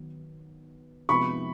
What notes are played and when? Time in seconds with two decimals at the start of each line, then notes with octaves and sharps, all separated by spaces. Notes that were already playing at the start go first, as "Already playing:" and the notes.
Already playing: D#3 F#3 B3
1.09 C3 F3 G#3 B3 B5 C#6